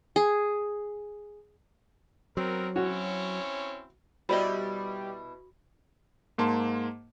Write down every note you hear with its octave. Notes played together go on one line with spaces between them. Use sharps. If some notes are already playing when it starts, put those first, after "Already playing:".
G#4
F#3 B3 C4 A#4
C4 C#4 E4 F#4 C#5
B2 G3 E4 F#4 C5 D5 D#5 B5
G#2 A#3 A5 C6